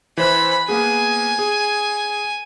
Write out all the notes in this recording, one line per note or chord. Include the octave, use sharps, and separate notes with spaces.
E3 C5 B5 F#6
A#3 B3 G#4 G#5
G#4